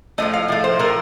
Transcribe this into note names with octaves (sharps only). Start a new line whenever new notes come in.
A2 F3 A3 D#5
F5
A2 F3 A3
C5
A2 F3 A3 A#4